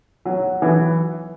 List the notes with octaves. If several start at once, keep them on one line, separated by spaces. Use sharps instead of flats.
F#3
E3